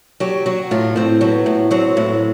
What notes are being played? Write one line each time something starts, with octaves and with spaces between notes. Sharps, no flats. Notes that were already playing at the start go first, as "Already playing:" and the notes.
F#3 G4
F#3 F#4
A2 F4
A2 C4
F#3 B3
A2
F#3 C4
A2